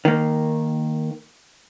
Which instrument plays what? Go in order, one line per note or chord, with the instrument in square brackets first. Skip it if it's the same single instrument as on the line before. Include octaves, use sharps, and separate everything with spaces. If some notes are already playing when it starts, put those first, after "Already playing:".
[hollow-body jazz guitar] D#3 A#3